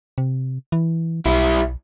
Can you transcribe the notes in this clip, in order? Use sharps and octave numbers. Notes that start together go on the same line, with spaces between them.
C3
E3
B1 G3 E4